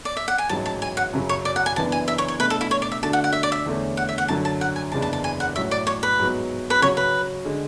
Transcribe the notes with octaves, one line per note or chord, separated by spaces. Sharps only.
D5
E5
F#5
G#5
A1 G#2 F#3 A5
A5
G#5
F#5
F#2 C#3 F#3
C#5
D5
F#5
G#5
F#1 F#2 E3 B3 D4 A5
G#5
E5
C#5
C#5
B2 A3 D4 B4
A4
E4
C#5
D5
E5
D3 A3 D4 F#4 A5
F#5
F#5
E5
D5
E5
E2 D3 A3 C#4
F#5
E5
F#5
F#2 D3 F#3 A5
A5
F#5
G#5
F#1 E2 C#3 G#3 D4 A5
A5
A5
G#5
F#5
A2 F#3 C#4 F#4 C#5 E5
D5
C#5
B4
G#2 F#3 B3 F#4
B4
C#3 F#3 C#4 F#4 C#5
B4
D3 G#3